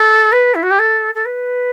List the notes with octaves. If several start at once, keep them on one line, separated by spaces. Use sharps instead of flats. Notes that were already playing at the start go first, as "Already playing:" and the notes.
Already playing: A4
B4
E4
F#4
G4
A4
A4
B4